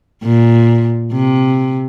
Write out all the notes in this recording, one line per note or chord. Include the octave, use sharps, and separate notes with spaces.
A#2
C3